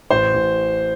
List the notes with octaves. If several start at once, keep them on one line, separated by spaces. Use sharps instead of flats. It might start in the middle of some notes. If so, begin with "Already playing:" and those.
A1 C5
A1